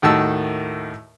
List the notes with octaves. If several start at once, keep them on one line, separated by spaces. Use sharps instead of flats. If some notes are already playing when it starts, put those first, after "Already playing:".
D#2 A2 D#3 F#4 A5 E6